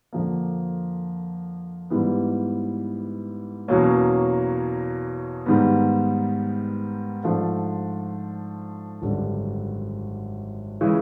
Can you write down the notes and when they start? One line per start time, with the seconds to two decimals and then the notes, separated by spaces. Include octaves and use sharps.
0.13 F2 D3 F3 A#3
1.90 G#2 E3 G3 B3
3.68 E2 B2 F#3 A#3 C#4
5.46 G#2 D#3 G3 B3
7.24 G#2 F3 A3 D4 F4
9.02 G#1 F#2 D3 G3
10.81 C#3 E3 G#3